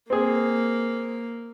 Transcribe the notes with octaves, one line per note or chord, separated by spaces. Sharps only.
A#3 C4 G#4